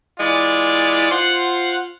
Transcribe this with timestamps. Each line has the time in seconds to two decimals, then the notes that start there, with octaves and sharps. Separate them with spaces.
0.19 E3 G#3 F4 D5
1.11 F4 C5 F#5